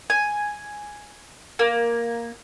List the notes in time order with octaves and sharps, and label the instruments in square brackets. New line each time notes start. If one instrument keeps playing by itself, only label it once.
[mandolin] G#5
A#3